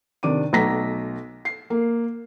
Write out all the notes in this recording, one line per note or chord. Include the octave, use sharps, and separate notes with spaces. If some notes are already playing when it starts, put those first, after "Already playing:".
C3 D#3 D4 D6 D#7
B1 A3 A#5 A#6 B6
C7
A#3